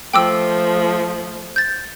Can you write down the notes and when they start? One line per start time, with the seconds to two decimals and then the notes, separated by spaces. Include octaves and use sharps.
0.13 F3 A3 G5 D6 E6
1.56 G6 A6